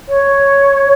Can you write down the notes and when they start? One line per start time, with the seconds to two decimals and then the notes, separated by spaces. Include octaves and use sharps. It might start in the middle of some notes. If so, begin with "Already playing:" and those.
0.09 C#5